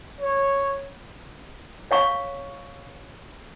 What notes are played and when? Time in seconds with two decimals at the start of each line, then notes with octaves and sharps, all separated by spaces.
0.20 C#5
1.91 C#5 F5 C#6